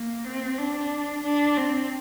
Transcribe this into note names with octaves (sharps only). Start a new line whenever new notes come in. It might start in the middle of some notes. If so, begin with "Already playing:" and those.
Already playing: A#3
C4
D4
D4
C4